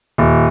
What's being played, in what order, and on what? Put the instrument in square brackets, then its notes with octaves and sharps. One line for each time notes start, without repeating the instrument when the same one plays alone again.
[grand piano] D#1